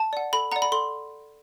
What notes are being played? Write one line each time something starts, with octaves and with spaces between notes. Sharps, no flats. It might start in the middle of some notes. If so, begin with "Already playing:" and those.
Already playing: A5
D5 F#5
A4 B5
D5 F#5 A#5
B5
A4 C6